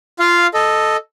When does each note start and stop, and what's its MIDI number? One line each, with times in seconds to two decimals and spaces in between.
0.19 0.47 65
0.19 0.47 77
0.54 0.97 69
0.54 0.97 75